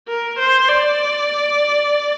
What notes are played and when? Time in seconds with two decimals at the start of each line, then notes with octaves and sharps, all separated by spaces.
0.08 A#4
0.39 C5
0.69 D5